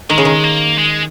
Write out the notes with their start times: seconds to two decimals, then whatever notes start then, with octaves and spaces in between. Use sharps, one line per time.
0.10 D#3 G#3
0.18 C#3
0.25 D#3
0.44 A#3
0.78 G#3